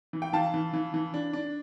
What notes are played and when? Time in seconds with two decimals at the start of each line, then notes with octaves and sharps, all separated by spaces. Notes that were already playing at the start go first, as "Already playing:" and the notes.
0.13 E3
0.22 G5
0.33 E3 F5 A5
0.54 E3
0.73 E3
0.94 E3
1.14 D4
1.33 D4